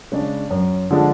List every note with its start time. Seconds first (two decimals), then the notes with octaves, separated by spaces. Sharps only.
0.12 C#3 G#3 D4
0.50 F#2
0.90 D3 F3 G#3 D4